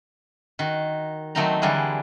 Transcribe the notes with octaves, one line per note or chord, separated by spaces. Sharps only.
D#3 F#4
D#3 F#3 A3 C4 D#4 A#5
D3 E3 G3 D4 F#4 G#4